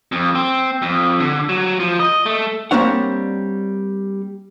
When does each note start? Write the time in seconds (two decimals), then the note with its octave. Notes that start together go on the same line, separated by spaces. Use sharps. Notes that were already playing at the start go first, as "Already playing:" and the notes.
0.12 F2
0.35 C4
0.82 F2
1.21 D3
1.49 F#3
1.80 F3
2.00 D#5
2.26 A3
2.71 G3 A#3 C4 D4 C#5 F#5